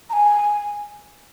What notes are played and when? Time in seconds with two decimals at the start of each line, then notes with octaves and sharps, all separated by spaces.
0.10 A#5
0.13 G#5